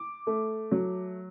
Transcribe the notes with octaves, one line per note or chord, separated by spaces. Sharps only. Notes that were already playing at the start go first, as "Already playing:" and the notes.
Already playing: D6
A3
F#3